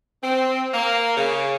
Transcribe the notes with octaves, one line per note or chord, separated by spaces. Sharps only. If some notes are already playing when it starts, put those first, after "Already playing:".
C4
A#3
C#3